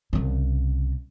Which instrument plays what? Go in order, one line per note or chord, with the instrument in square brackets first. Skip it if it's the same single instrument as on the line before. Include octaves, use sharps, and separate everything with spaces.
[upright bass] C2 C#3